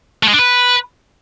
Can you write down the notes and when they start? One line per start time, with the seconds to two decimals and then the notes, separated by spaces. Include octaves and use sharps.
0.23 A3
0.28 G#3
0.33 D4
0.39 B4